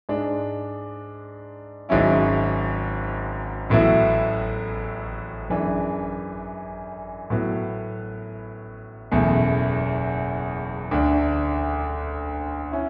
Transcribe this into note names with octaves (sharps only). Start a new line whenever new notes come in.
G#2 G#3 D4
G#1 G#2 F#3 C#4 E4
A1 A2 F#3 B3 E4
F#2 E3 G#3 D4
A2 F#3 B3
F#1 E2 B2 A3
D2 D3 A3 D4
C#4 E4